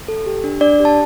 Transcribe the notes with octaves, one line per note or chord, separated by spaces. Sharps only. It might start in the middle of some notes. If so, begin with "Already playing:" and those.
A4
G4
D4
D4 D5
G4
A5